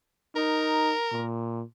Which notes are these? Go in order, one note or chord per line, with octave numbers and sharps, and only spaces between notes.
D#4 A#4
A#2